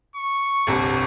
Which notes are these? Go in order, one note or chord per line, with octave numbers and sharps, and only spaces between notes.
C#6
G1 C2 C3